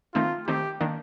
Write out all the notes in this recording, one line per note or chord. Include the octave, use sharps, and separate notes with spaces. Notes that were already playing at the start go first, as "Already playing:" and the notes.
D#3 A3 C4 D#4 F4
D#3 A3 C4 D#4 G4
D#3 A#3 D4